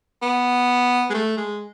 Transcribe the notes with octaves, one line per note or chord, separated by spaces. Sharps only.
B3
G#3
A3
G#3